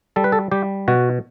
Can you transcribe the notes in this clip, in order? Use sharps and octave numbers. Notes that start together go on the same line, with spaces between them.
G3 A4
B4
A4
G3 G4
B2 F#4